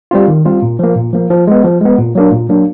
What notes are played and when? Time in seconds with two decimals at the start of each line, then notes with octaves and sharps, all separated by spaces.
0.11 G3 C4 F4
0.28 D#3
0.45 G3 C4 F4
0.62 A#2
0.79 F3 A#3
0.96 A#2
1.13 F3 A#3
1.30 F3
1.47 G#3 B3
1.64 F3
1.81 G#3 B3
1.98 A#2
2.15 F#3 A#3 D4
2.32 A#2
2.49 F#3 A#3 D4